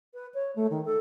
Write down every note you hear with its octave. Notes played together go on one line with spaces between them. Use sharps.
B4
C#5
A3
D#3
A4